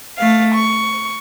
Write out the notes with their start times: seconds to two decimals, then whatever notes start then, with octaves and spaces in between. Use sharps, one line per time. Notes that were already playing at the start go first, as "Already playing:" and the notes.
0.17 A3 F5
0.54 C#6